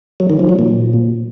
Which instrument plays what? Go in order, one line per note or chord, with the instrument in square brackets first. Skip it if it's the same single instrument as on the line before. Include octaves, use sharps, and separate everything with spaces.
[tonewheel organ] F#3
D#3
F3
F#3
A#2